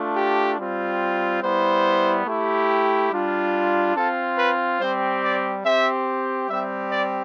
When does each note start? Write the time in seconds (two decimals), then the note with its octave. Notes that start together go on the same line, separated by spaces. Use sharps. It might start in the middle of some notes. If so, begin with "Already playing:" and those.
Already playing: A3 D4 F4
0.15 G4
0.58 G3 C4 F4
1.42 G3 B3 E4 C5
2.26 A3 E4 G4
3.11 G3 D4 F4
3.95 C4 F4 A4
4.38 B4
4.80 G3 C4 G4 C5
5.22 D5
5.64 C4 G4 E5
6.48 G3 C4 G4 E5
6.91 D5